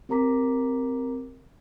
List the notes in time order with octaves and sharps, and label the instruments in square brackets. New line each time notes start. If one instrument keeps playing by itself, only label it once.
[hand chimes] C4 G4 A#4 A#5 D6 B6